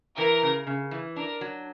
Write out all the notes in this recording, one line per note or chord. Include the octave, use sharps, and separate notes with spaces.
E3 A#4
C#3
C#3
E3
D4 A#4
F#3